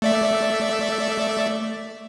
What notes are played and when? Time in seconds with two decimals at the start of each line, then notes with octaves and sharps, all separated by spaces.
0.02 A3 D5 E5